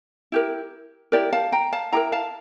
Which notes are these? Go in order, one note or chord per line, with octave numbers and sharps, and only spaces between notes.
E4 G4 A#4
E4 G4 A#4 D5
F5 A5
G5 A#5
F5 A5
E4 G4 A#4 G5 A#5
F5 A5